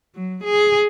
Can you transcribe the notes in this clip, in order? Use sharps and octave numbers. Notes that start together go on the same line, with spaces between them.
F#3
G#4